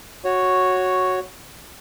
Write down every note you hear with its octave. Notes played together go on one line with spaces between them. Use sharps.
F#4 C#5